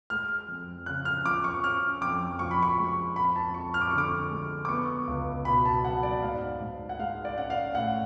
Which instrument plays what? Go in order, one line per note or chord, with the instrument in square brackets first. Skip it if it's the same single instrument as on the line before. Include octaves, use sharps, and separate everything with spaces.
[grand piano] G#3 F6
F2
C#3 F#6
F6
F3 D6
C#6
C#4 F6
F2 D6
F3 C#6
B5
C#6
G#3
F2 B5
A5
F2 C#6
F6
D6
D3 C#6
D6
G#3
D6
B3 C#6
C#2
B2 B5
A5
F#3 F#5
D5
G#2 F5
G#2
F#5
G#3 F5
D5
C#4 F#5
F5
A2 F#5